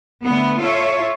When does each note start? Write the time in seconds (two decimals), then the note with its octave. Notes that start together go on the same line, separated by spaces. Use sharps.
0.24 D3 A3 B3
0.61 F4 A4 C#5 E5